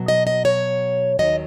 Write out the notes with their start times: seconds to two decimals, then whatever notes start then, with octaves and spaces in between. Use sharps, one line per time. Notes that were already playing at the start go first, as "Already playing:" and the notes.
Already playing: B2 F#3
0.08 D#5
0.27 D#5
0.45 C#5
1.19 D#2 D#3 F#3 D#5